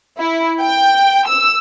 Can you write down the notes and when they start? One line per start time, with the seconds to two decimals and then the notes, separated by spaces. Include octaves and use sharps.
0.17 E4
0.60 G5
1.27 E6